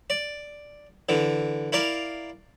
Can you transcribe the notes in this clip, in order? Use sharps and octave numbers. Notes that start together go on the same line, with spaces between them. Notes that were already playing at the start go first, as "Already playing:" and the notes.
D5
D3 E3
E4 A#4 D5 F5